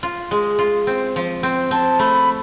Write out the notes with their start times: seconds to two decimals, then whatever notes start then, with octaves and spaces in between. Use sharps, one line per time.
0.03 F4
0.31 G#3
0.59 F4
0.87 C4
1.16 F3
1.43 C4
1.71 C4 A5
1.99 A3 B5